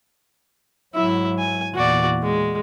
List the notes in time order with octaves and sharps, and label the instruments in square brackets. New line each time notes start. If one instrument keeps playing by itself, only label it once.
[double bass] G#2 F#3 [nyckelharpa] E4 E5
[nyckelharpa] G#5
[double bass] E2 A#2 [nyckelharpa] F#4 D5
[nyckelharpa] G#3